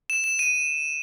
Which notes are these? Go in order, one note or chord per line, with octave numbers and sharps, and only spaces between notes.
E7
E7
D#7